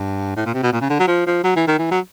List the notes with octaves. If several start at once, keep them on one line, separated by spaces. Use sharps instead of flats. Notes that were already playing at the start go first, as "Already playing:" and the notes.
Already playing: G2
A2
A#2
C3
B2
A#2
C#3
D3
F#3
F3
F3
F#3
E3
D#3
E3
F#3